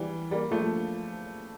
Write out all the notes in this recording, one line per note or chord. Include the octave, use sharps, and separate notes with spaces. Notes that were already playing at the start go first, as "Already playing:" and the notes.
Already playing: E3 G3
G3 A#3
F3 A3